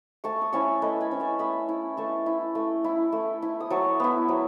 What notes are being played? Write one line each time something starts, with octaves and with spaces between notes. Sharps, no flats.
A3 A5 C#6
D#6
C#4 E4 A5 C#6
A3 B4 D#5
G#5 B5
C#4 E4
A5 C#6
A3 B5 D#6
E4
A3 A5 C#6
E4
A3
E4
A3
E4
D#6
F#3 A5 C#6
B3 E4
F#3